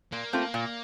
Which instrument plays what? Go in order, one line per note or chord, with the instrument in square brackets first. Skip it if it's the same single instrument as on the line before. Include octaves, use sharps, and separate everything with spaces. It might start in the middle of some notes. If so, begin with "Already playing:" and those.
[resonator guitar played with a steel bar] A#2 [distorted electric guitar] A#3
[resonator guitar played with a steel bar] A3 C4 F4
A#2